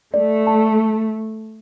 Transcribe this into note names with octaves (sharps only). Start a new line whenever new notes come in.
A3 D5
A5